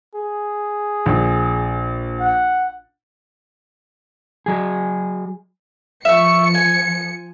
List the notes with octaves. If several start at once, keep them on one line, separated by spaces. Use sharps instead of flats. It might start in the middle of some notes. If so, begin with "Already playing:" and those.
G#4
A#1
F#5
F#3 G#4
F3 E5 C#6 C#7
G#5